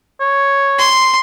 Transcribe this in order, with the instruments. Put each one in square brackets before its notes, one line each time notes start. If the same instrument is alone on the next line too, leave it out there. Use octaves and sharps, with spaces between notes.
[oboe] C#5
[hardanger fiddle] C6